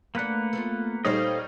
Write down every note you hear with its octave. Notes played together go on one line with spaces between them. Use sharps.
A3 A#3 D4 B4 F#5
A3 B3 F4
A#2 G3 D#4 A4 C5 C#5 D#5 F5